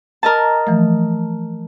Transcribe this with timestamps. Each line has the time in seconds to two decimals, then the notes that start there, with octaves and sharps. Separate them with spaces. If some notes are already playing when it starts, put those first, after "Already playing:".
0.23 A#4 D#5 A5
0.67 E3 F3 A3